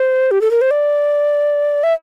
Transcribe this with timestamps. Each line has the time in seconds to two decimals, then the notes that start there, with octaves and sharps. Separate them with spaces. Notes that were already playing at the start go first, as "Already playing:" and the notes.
Already playing: C5
0.31 G4
0.41 A4
0.51 A#4
0.61 C5
0.71 D5
1.83 E5